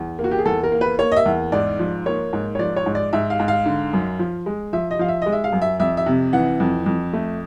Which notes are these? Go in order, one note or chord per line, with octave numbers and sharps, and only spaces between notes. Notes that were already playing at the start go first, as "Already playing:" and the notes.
Already playing: E2
A#3
F#4
G4
G#4
E2 A4
A#4
A#3
B4
A#3 C#5
D#5
E5
E2
G#2 D5
F3
A#3 C#5
G#2
C#5
F3 D5
C#5
G#2
D5
G#2 E5
F5
G#2
F5
D3
F#2
F3
G#3
F3 E5
D#5
F3 F5
E5
G#3 D#5
E5
F5
F#2
E5
F2 E5
E5
C3
E3 F#5
F2
F2
A3